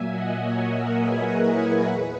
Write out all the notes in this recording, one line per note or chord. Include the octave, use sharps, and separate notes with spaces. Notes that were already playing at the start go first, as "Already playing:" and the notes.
Already playing: A#2 F#3 A#3 E5 G#5
D#5 F#5
C#5 E5
A#4 C#5
G#4 B4
E4 G#4
G#4 B4
E2